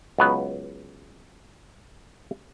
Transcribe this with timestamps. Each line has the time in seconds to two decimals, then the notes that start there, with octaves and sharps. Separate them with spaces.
0.19 C#2 F#3 B3